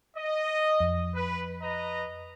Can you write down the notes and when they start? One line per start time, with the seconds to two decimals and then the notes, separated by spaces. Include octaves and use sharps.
0.17 D#5
0.80 F2
1.15 B4
1.61 B4 D#5 A#5